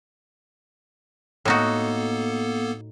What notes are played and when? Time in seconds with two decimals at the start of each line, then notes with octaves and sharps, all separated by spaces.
1.45 A2 A#3 B3 D#4 F#4 A4